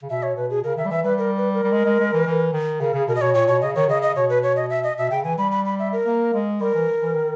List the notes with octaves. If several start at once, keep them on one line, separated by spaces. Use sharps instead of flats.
C#3
B2 E5
C#5
B2 B4
G#4
C#3 A#4
D#3 E5
G3
E3 E5
G3 B4
A#4
B4
A#4
G3
G#3
G#3
G#3
E3
E3
D#3
C#3 A#4
C#3 G#4
B2 A#4
D#5
B2 C#5
A#2 C#5
B2 C#5
C#3 D#5
D#3 C#5
C#3 D#5
D#5
B2 C#5
B4
C#5
D#5
E5
D#5
B2 E5
C#3 G5
E3 G#5
G3 B5
B5
B5
E5
A#4
A#3
G#3
G3 A#4
E3
E3
D#3